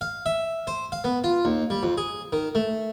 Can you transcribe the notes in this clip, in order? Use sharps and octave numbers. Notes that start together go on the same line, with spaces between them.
F5
E5
C5
F5
B3
F4
D#2
G3
F2
G#4
D#3
A3